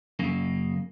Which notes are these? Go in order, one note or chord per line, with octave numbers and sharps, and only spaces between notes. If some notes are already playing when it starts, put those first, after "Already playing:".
F#2 C#3 A#3